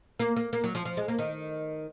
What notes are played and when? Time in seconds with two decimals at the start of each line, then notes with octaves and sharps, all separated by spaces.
0.19 A#3
0.36 A#3
0.53 A#3
0.64 F#3
0.75 F3
0.85 F3
0.97 G#3
1.08 A#3
1.19 D#3